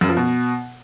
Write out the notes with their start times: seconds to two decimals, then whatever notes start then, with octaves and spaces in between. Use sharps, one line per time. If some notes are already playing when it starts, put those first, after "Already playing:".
0.01 F#2
0.09 F3
0.17 B2